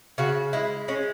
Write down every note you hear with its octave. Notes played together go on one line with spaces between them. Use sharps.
C#3 F#4
G#3 E4
G#3 C#4